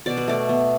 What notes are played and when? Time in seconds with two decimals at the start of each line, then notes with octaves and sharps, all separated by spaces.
0.06 B2 D5
0.18 B4
0.28 A3 D5
0.49 B3